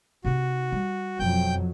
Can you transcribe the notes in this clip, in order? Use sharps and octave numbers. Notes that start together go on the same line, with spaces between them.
C3 D#4 F#4
G3
E1 F2 F#3 F4 G5 G6